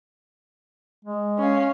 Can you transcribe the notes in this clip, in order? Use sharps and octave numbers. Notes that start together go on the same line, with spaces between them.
G#3
C#4 F5